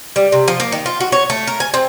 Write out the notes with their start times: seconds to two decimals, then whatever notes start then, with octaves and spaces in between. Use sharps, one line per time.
0.16 G3
0.32 C3
0.48 F3
0.60 A#3
0.72 D#3
0.86 F4
1.00 F#4
1.12 C#5
1.30 A3
1.47 A#4
1.60 G#5
1.74 C4